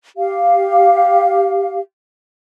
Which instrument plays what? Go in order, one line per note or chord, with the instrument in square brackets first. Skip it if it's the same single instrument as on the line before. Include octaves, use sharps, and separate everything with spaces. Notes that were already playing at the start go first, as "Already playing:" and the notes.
[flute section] G4 F5